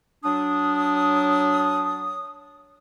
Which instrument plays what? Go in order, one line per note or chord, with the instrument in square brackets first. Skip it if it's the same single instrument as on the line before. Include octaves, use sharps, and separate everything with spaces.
[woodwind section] F#3 D4 D#6